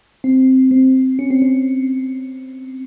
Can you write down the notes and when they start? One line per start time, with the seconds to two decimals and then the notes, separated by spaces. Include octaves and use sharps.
0.24 C4
0.71 C4
1.19 C#4
1.30 C4
1.42 C#4